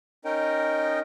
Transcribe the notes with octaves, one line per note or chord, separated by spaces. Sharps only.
C#4 D#4 A#4 D#5 G5